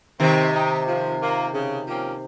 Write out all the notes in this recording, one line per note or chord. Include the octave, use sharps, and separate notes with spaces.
C3 D#3 C4
D#4 G4
F3
A#3 F4
C#3
F3 A#3 C#4 G4